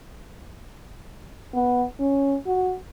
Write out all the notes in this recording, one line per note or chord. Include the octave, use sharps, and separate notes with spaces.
B3
C#4
F#4